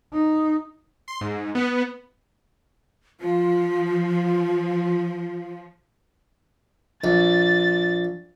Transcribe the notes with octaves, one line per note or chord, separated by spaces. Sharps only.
D#4
C6
G#2
B3
F3 F4
A#1 A6